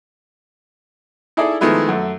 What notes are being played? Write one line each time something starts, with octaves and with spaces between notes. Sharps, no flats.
D#4 E4 G#4 A4 D5 D#5
D#3 F3 G#3 A3 B3 E4
F#2 A3